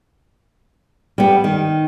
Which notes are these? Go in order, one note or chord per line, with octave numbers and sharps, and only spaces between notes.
G3 B3
D#3